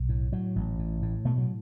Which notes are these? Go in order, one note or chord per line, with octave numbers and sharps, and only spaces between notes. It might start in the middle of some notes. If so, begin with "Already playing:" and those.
Already playing: B1
A2
A2 F#3
A1
A2
A2
B2 A3
F#3